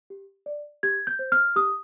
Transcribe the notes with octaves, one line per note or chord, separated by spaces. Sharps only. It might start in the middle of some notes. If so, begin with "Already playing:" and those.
G4
D5
G4 G#6
G6
C5
F6
G4 D#6